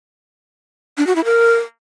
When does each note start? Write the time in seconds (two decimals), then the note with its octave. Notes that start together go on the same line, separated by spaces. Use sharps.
0.98 D4
1.07 F#4
1.16 E4
1.25 A#4